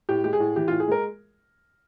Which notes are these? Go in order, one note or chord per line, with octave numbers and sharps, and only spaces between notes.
A2 G4
G#3 G4
G#4
A2
E3 G4
A2 F4
G#4
G#3 A#4